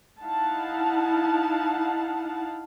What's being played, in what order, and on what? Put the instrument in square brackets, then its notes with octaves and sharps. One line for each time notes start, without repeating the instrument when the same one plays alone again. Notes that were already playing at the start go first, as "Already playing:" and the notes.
[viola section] D#4 E4 F5 F#5 A5